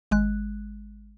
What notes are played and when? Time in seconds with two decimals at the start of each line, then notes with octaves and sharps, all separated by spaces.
0.11 G#1 G#3 F#6